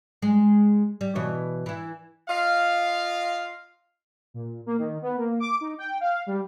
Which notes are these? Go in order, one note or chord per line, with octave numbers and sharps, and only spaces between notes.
G#3
G3
B2 E3 C#5
E3 E4
F4 D#5 F5
A#2
A#3
D#3
B3
A#3
D6
D#4
G5
F5
G3